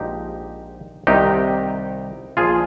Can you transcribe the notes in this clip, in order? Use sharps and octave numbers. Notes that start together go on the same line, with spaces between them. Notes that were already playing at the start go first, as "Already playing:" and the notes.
Already playing: A#1 G#2 F3 D#4 G4
C2 C3 D#3 D#4 G4
A#1 A#2 F3 F4 G#4